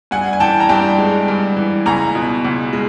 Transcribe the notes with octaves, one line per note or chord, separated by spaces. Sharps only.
G2 F#5 G#5
G#5
E3 G5 A5
A#5
G2 G5 A5
G#3
G2
E3
C#2 G#5 A#5
B2
C#2
G#3